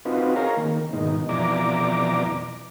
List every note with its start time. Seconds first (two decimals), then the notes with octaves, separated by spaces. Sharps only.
0.05 C4 D#4 F4 F#4 B4
0.36 G#4 A#4 C#5 F5 A#5
0.57 D#3 A#3
0.93 G#2 B2 D#3 D#4
1.29 F2 B2 E3 D5 A#5 D6